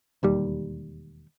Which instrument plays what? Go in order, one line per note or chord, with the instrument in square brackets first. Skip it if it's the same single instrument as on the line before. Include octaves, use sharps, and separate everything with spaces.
[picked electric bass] E1 D#2 G3